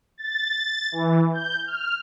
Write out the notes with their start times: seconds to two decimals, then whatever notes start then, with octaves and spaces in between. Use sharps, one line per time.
0.18 A6
0.92 E3
1.33 G6
1.66 F6